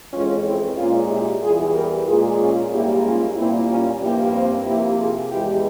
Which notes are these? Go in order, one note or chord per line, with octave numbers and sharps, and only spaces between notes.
F2 E3 G#3 C#4 F4
C4 E4
A#2 G#3 C#4 F4
E4 G4
E2 E3 G3 F4 G#4
G4 A#4
A#2 G#3 F4 G#4
C#4 F4
G#2 G3 A#3 E4 G4
C#4 F4
A#2 G3 A#3 C4 E4
C#4 F4
G2 F3 A#3 E4 G4
C4
C3 F3 A#3 E4 G4
F4 G#4
E2 E3 G#3 E4 G4